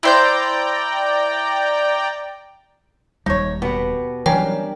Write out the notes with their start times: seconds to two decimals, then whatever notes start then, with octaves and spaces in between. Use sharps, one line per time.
0.03 E4 C5 D5 G5 A#5 G6
3.26 D#1 D#2 G3 D#4 C#5
3.62 B2 B3 G4 F#5
4.26 E3 F#3 G3 C#4 D4 A#4 G5